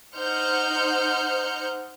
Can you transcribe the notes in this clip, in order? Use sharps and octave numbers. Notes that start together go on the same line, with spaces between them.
D#4 C5 F#5 F6 G6 C#7